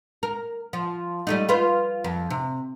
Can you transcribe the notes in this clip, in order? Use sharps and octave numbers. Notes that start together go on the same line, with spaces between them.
A#4
F3
G3 A3 D#4
F4 B4 C5
F2
C3